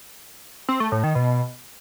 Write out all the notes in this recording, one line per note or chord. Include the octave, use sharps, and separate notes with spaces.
C4
A3
A2
D#3
B2